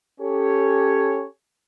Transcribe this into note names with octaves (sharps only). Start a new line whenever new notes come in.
C#4 G4 A4 C#5